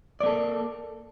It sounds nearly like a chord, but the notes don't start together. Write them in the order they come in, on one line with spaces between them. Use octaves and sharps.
D5 A#3 A4